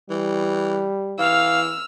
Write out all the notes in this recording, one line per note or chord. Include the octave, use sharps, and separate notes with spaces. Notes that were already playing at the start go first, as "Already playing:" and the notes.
E3 G3
E3 F5 E6 F6